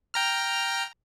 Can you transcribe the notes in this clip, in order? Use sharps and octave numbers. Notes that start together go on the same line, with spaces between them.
G5 A#5 F6